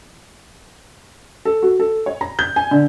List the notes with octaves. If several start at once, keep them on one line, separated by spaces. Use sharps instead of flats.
A4
F#4
A4
C#5
A#5
G6
G#5
D3